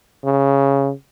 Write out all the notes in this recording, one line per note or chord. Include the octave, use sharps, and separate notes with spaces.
C#3